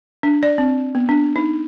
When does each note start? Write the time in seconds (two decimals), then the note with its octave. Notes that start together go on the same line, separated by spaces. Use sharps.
0.23 D4
0.43 D5
0.58 C4
0.95 B3
1.09 D4
1.36 D#4